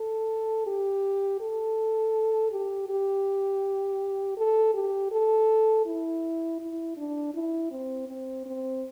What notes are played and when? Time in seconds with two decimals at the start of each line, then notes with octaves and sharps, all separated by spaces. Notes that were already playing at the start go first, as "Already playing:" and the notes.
Already playing: A4
0.67 G4
1.41 A4
2.52 G4
2.89 G4
4.37 A4
4.74 G4
5.12 A4
5.86 E4
6.60 E4
6.97 D4
7.34 E4
7.71 C4
8.08 C4
8.46 C4